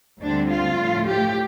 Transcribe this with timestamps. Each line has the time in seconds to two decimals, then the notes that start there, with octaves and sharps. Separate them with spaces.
0.20 D2 D3 G3 C4 D4
0.49 F4
0.77 A2 F3 A3
1.06 G4